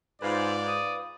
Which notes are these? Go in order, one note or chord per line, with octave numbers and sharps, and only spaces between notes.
G#2 F4 B4 D5 F5 B5
D#6